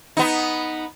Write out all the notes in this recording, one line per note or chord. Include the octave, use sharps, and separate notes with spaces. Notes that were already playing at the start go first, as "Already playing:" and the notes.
B3 D#4